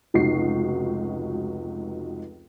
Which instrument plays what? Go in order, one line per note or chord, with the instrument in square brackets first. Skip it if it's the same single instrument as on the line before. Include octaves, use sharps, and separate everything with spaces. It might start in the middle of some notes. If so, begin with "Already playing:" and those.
[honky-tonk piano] F1 C#2 D#4 F#4 C7